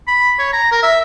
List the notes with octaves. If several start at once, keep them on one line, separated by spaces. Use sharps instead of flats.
B5
C#5
A#5
A#4
E5